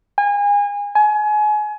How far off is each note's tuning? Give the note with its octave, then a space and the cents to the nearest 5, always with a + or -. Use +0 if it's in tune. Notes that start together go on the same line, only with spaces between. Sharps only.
G#5 -30
G#5 +30